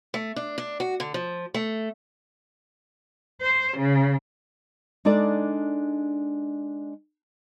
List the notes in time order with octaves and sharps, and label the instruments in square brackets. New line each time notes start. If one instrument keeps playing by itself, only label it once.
[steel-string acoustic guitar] A3
D4
D4
F#4
D3
F3
A3
[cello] C5
C#3
[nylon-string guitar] G#3 D4 D#4 A4 D5